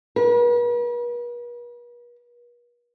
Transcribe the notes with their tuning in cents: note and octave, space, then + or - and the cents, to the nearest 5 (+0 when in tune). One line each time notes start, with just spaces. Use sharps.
B4 -45